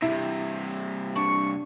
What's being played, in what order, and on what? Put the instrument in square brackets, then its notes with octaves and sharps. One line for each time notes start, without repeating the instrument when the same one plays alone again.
[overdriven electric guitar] G2 C3 [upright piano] E4
[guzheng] D4 [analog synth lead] C#6